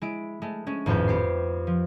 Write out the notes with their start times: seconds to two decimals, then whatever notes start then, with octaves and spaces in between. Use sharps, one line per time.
0.02 G#3 E4 D7
0.42 G#3 A3
0.67 G#3 C#4
0.86 G#1 F2 A2 B4 G6
1.08 B3 G4 C7
1.67 F3